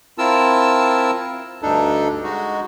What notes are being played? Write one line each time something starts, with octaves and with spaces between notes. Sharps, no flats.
C4 E4 F4 A#4 A5 E6
D2 G2 D4 D#4 A4
G#3 D#4 F#4